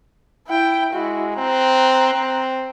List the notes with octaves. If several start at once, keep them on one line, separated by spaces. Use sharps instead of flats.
E4 G5
G#3 E4 F#4
C4 A#5 F#6
C4